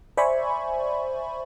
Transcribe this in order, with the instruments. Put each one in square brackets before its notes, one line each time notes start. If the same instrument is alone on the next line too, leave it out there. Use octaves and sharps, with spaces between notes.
[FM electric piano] C5 D5 E5 G#5 B5 C#6